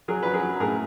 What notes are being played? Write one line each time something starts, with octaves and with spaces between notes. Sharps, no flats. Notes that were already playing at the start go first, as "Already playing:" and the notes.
F#3 G#4 A#4
F#3 B4
G#4 A#4
F#3
A2 G#4 A#4